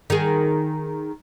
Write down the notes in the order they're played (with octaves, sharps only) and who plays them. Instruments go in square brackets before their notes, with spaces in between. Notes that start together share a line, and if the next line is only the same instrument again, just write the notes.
[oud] D#3 G#4